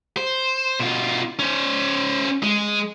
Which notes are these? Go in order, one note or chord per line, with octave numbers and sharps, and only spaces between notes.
C5
B2 F4
C#4 C5
G#3